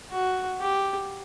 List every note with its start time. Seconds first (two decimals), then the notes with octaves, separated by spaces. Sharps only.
0.12 F#4
0.60 G4